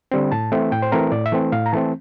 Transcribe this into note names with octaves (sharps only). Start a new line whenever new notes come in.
D3 G3 C4
A2 A5
E3 A3 C4
A2 G5
C5
E3 A3 C4 A#4
A2 D5
E5
E3 A3 C4
A2 F5
A#5
E3 A3 C4 A5